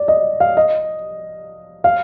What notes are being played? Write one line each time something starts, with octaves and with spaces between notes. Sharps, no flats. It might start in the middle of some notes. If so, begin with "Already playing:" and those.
Already playing: D5
D#5
F5
D#5
F5